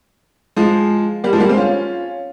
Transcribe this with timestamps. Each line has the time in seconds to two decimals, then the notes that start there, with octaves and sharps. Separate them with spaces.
0.56 F3 G#3
1.24 G3 A#3
1.33 F3 G#3
1.40 G3 A#3
1.49 G#3 C4
1.57 C#4 F4